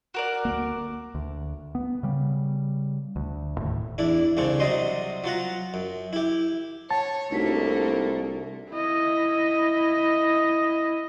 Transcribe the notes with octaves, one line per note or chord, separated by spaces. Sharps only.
F#4 A#4 D5
D2 A#3
D2
B3
C#3 G3
D2
E1 D#2 A2
E2 D4 E4
C2 C#3 C4 D4 C#6
C3 F#3 G3 D#5 C6
F#3 F4 F#5 A#5
F#2
E4 G4
C#5 F#5 A5
C2 A3 A#3 D4 D#4 F#4 A4 B6
E4 D#5